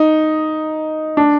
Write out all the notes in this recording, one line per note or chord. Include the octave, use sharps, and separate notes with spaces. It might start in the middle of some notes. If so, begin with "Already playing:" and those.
Already playing: D#4
D4